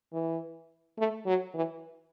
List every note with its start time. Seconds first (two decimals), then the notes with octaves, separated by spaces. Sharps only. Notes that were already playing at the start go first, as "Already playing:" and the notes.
0.13 E3
0.98 A3
1.26 F#3
1.54 E3